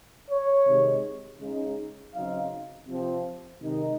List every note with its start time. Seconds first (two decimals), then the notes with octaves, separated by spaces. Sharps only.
0.29 C#5
0.66 C3 D#3 G#3
1.39 C#3 G#3 D#4
2.13 C#3 F#3 C4 D#4 F5
2.87 C3 F3 C4
3.61 C3 D#3 G#3 D#4